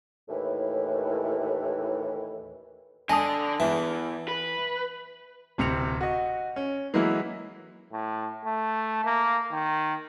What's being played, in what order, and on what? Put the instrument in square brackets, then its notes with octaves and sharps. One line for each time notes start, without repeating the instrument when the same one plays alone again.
[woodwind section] D#2 A2 E3
[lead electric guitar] D3 D4 [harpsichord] D#5 [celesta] G#5 A5 D#6
[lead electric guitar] E2 [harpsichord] E3
[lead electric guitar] B4
[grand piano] D1 C3 C4 C#7 F7
F#4 D#5
C#4
E3 F#3 G#3 A#3 E4
[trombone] A2
A3
A#3
D#3